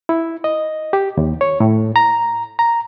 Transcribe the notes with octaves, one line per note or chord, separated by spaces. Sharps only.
E4
D#5
G4
D#2
C#5
A2
A#5
A#5